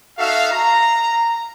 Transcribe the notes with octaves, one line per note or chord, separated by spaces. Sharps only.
D#4 F#4 A4 E5 F5
A#5